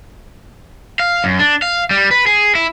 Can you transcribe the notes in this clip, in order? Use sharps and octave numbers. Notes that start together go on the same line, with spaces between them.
F5
F#2
D4
F5
G3
B4
G#4
E4